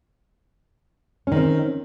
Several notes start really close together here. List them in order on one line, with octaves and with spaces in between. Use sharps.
C#4 D#3 C4